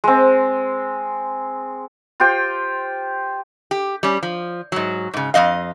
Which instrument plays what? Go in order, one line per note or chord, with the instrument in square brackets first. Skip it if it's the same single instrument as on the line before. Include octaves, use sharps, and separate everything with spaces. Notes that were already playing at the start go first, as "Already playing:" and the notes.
[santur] G#3 C4
F4 G4 C5 G5
[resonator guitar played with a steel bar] G4
G3 C#4
F3
G#2 F#3
G#2 C#3
F2 A3 D#5 F5